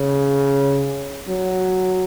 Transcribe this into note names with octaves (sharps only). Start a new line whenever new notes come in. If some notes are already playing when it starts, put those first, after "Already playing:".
Already playing: C#3
F#3